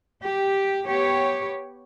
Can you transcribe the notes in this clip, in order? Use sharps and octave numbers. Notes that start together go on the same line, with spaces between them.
G4
B3 G4 C#5